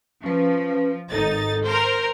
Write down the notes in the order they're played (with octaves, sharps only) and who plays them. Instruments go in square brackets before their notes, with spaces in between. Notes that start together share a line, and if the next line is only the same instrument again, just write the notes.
[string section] F3 [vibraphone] C#4 B4
[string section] G#1 D#4 A6 [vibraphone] A4
[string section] A#4 C5